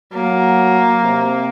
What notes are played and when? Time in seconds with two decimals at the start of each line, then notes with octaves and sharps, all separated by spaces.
0.13 F#3 A#3
1.02 C3